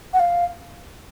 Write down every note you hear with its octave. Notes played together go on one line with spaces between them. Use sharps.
F#5
F5